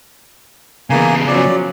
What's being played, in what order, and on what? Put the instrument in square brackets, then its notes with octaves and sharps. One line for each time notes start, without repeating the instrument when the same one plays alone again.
[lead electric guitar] C#3 B3 [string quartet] E3 G#4 [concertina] A#3 G#5
[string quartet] F3 F#3 C#4 [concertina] D5